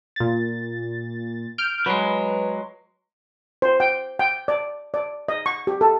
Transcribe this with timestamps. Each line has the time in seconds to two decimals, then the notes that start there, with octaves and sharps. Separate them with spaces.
0.16 A#2 A6
1.58 F6 G6 D7
1.86 F#3 G#3 B4
3.62 C5
3.80 G5
4.19 G5
4.48 D5
4.94 D5
5.28 D#5
5.46 C#6
5.67 G4
5.81 A4